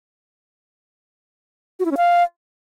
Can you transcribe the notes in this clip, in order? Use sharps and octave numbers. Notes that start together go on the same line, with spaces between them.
F#4
E4
C#4
F5